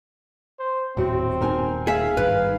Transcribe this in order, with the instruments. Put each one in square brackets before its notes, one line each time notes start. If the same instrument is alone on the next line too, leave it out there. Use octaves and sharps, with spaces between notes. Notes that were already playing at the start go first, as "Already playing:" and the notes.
[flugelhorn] C5
[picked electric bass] D#1 [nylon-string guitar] A2 F#4 [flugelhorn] C4
[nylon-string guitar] D#4 A#4 G#5
[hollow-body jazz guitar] G#4 E5 [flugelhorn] F5
[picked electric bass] G#1 G2 [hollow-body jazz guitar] B4